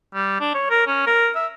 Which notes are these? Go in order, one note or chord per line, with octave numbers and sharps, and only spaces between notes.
G3
D4
C#5
A#4
C#4
A#4
E5